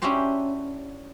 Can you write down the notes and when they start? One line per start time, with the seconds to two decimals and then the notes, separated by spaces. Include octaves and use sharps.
0.02 C#4 D4 E4 F#4 G4 C5